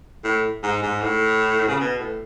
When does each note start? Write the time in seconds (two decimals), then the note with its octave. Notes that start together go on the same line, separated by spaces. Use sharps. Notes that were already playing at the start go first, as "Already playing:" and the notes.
0.24 A2
0.63 G#2
0.83 G#2
1.02 A2
1.69 C#3
1.80 B2
1.99 A2